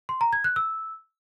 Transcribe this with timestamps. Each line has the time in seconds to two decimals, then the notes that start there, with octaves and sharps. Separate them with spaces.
0.09 C6
0.21 A#5
0.33 G#6
0.44 F#6
0.56 E6